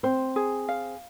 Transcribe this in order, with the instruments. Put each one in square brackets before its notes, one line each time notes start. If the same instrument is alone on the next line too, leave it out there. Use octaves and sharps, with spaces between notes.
[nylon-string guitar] C4 [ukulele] C5
[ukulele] G#4
F5